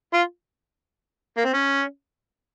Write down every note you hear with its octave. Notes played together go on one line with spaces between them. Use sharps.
F4
A#3
C4
C#4